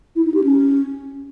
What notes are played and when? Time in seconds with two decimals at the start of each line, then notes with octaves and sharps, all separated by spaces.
0.16 E4
0.25 D#4
0.34 G4
0.44 C#4